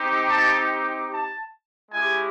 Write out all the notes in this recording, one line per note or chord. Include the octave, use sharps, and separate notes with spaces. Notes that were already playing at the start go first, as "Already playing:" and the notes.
Already playing: C4 D#4 G4
A5
A5
G#3 C#4 E4 G4 G#5